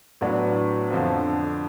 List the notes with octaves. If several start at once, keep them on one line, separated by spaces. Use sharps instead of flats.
A2 F#3 B3 D4
F2 D3 F3